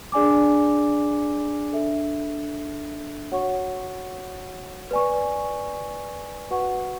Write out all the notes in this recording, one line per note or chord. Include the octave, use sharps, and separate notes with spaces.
D4 G#4 D5 G#5 D6
D4 A4 E5
F#4 C#5 F#5 C#6
B4 D5 G#5 C#6
F#4 B4 F#5 C#6